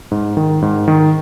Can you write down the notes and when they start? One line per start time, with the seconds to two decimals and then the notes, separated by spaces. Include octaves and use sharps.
0.11 G#2
0.37 D#3
0.62 G#2
0.88 D#3